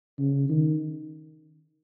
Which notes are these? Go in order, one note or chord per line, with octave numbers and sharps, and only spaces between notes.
C#3
D#3